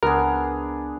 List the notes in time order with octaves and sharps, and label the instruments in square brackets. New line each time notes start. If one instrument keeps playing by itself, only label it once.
[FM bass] C#2 [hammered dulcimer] B3 D4 G#4 [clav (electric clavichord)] A#4